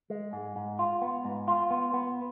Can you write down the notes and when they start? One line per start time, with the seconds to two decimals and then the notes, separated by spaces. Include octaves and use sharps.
0.10 G#3
0.33 G#2
0.56 G#2
0.79 F4
1.02 B3
1.25 G#2
1.48 F4
1.71 B3
1.94 B3